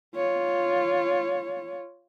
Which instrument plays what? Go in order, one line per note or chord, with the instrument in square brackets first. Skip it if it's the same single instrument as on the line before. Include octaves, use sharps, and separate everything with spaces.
[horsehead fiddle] F4 C#5